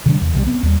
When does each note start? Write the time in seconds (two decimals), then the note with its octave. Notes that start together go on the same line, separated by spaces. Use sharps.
0.06 C3 D#3 G3 D4
0.21 E2
0.34 B1 C3 E3 G3
0.47 B3 C4
0.63 D#2 G3